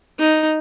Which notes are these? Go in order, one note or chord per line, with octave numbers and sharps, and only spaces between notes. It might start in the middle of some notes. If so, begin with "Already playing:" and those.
D#4